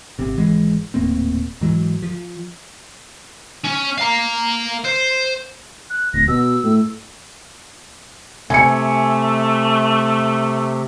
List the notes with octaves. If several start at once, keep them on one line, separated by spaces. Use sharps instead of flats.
G#1 C3
G#1 E3 G#3
D#1 A2 A#3 C4
G#2 E3 F#3
F3
C#4
F5 A#5
C5
F#6
D1 A#6
B2 E6
A2
C3 A3 G#5 C#7